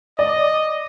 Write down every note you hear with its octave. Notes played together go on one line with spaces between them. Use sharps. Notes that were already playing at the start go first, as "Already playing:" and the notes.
D5 D#5